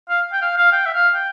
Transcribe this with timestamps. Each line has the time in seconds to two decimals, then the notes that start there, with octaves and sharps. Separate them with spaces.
0.10 F5
0.33 G5
0.42 F5
0.57 F5
0.72 G5
0.86 E5
0.94 F5
1.14 G5